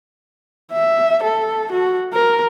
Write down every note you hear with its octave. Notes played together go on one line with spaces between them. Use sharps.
E5
A4
F#4
A#4